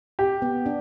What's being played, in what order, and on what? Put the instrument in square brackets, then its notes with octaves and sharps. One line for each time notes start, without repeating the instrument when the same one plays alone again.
[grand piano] G4
[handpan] B3
D4